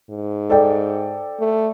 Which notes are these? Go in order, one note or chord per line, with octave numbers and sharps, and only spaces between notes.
G#2
A4 D5 G5
A3